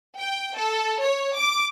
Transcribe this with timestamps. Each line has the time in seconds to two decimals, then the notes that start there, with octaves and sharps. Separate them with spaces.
0.19 G5
0.55 A4
1.03 C#5
1.37 D6